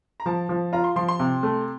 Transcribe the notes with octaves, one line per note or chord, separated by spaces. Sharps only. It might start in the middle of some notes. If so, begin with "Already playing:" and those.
A#5
F3 A5
F3
F4 A#5
C6
F3 C6
C6
C3
A3